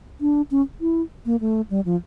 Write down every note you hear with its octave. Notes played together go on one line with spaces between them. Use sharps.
D4
C#4
E4
A#3
A3
G3
F3